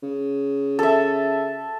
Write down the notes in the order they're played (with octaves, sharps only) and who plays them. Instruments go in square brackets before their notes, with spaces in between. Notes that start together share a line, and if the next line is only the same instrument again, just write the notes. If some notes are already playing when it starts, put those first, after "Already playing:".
[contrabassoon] C#3
[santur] A4 E5